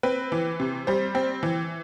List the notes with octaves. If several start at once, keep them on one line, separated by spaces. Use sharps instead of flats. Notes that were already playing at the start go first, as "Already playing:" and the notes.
C4 B4
E3
C3
G3 C5
C4
E3